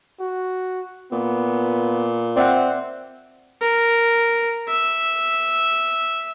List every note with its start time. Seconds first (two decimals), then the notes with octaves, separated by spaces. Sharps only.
0.20 F#4
1.12 A#2 B3
2.37 C4 D5 E5 F#5
3.61 A#4
4.69 E5